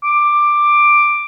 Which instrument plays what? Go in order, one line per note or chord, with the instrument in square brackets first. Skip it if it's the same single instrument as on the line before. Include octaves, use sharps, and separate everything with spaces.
[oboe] D6